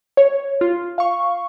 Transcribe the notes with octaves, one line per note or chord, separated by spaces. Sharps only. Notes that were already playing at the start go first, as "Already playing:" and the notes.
C#5
F4
F5 C#6